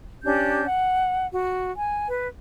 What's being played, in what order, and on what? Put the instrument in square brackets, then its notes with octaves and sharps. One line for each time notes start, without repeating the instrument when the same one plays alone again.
[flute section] C#4 D4 G4 G6
F#5
F#4
G#5
B4